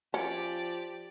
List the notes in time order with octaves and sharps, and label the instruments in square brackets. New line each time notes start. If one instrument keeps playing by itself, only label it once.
[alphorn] F3 [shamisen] C#4 [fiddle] G4 D5